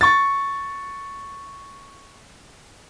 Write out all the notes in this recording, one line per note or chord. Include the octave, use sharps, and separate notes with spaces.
C#6 A6